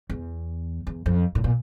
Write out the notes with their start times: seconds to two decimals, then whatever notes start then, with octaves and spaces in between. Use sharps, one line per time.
0.10 E2
0.87 E2
1.06 F2
1.35 A2
1.44 A#2